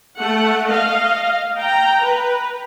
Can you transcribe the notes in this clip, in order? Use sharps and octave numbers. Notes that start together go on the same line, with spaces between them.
A3 F#5
D#5 F5
G5 A#5
B4